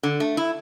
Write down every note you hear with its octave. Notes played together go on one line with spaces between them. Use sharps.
D3
A3
E4